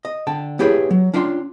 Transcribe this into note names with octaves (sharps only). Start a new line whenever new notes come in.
D#5
D3 G5 A5
B3 E4 G4 G#4 B4 C#5
F#3
C#4 D4 E4 F4 G5 C6